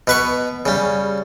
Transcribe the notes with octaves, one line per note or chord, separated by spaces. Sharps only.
B2 B4 C#6
C#3 G3